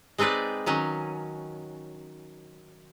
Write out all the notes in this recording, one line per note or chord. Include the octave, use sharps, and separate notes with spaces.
G#3 C4 D#4 B4 D5
D#3 F#3 C#4